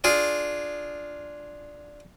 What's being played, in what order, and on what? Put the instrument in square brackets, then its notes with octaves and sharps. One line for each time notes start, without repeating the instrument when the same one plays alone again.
[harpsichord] D4 F4 G#4